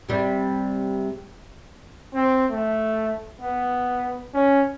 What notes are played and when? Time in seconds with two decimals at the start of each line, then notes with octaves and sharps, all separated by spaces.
0.09 C3 G3
2.14 C4
2.51 A3
3.41 B3
4.34 C#4